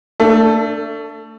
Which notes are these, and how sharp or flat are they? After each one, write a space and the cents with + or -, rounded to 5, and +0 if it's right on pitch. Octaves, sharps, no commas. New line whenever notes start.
A3 +30 D4 +0 A4 +0